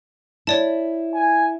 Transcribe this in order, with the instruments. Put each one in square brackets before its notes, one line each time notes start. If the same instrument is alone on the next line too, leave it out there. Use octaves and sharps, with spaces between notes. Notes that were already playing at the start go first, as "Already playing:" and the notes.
[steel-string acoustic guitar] E4 [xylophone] C#5 D5 A5
[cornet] G#5